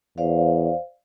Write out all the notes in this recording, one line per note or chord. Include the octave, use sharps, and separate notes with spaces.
E2 C5 D5 F5